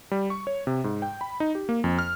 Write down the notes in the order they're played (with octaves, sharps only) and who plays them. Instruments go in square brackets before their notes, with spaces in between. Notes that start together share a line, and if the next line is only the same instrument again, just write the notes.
[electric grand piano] G3
C#6
C#5
C3
G#2
G5
B5
D#4
G4
A#3
F2
F6